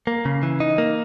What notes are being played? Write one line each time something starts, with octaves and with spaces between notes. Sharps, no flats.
A#3
C#3
E3
D#4
A#3